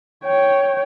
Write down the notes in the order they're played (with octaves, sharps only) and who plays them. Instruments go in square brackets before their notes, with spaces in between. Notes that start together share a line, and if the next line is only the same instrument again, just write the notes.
[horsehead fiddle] C#5 G5